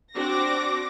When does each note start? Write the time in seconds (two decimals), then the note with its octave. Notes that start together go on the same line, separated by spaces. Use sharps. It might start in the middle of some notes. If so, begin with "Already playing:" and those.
0.16 C4 D4 F#4 D6 A#6